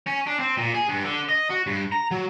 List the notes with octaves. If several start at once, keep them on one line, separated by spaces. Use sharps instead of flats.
C#4
D4
C4
A#2
G#4
G2
D3
D#5
F#4
G2
A#5
F#3